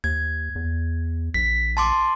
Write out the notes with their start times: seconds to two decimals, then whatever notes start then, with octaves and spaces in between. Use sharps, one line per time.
0.04 D#2 G#6
0.56 E2
1.34 A#1 B6
1.77 A5 C6 D6